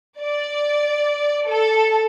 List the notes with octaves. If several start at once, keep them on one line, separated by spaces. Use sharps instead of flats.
D5
A4